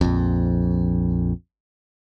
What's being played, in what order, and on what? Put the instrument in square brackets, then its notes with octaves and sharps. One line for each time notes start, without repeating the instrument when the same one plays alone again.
[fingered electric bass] A#1 F2